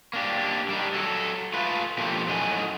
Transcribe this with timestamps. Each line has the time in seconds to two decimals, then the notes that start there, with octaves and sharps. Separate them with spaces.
0.13 A#3 D4 G4
0.69 G3 D4 D#4
0.94 F#3 A4
1.53 A3 F4 B4
1.98 B2 F3 A#3 G4 A4 C5
2.27 F#2 A2 D#4 F#5 G#5